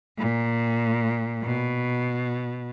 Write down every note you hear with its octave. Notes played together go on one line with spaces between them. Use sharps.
A#2
B2